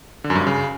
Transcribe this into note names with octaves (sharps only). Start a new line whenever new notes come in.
D3
F#2
G2
F#2
C#3